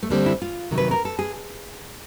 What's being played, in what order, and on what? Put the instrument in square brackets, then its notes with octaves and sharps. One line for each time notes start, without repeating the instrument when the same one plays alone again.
[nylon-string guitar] A3
[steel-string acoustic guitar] D3 G3 C4 [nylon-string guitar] A#3
[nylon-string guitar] E4
F4
[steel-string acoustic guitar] E2 C3 D#3 F#3
[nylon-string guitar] B4
A#4
A4
G#4